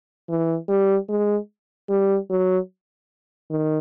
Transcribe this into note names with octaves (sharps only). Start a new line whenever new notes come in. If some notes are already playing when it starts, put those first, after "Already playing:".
E3
G3
G#3
G3
F#3
D#3